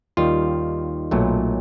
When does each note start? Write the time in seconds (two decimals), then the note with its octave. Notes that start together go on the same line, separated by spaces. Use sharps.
0.17 D#2 D#3 G3 F4
1.11 B1 A#2 F#3 A3